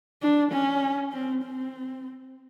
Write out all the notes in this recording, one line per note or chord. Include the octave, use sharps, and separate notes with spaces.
D4
C#4
C4
C4